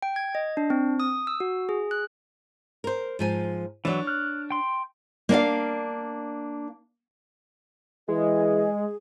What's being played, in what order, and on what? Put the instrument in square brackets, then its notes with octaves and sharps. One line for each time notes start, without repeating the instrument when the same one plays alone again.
[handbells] G5
G#6
D#5
D4
C4
D#6
E6
F#4
G#4
F#6
[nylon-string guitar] A#4 C5
G#2 F3 G#5
[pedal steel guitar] E3 F#3 [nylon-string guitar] D4 C#5
[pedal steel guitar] F6 F#6
G5 C6
[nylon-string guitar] A#3 D4 D5 F5
[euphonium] E3 [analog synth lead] G#3 [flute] G#4 [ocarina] D#5